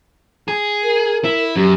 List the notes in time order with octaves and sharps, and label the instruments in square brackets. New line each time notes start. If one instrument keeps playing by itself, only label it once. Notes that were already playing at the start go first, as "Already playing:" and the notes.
[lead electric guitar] G#4
[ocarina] A#4
[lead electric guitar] E4
[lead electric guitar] F#2 [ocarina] G4